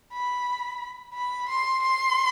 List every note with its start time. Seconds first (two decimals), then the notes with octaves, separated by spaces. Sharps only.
0.13 B5
1.15 B5
1.49 C6
1.83 C6